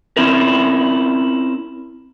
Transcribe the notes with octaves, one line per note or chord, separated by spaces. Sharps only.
C4 C#4 E4 A#4